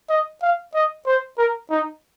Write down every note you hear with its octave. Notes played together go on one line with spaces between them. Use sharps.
D#5
F5
D#5
C5
A#4
D#4